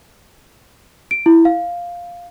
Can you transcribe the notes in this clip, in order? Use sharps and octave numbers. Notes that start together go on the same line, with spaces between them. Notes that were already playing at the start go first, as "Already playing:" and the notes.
D7
E4
F5